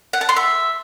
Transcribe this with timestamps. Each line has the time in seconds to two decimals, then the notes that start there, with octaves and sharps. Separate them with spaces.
0.13 F#5
0.21 A5
0.29 C6
0.36 E5